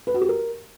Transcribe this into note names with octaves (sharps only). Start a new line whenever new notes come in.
B4
F#4
G4
A#4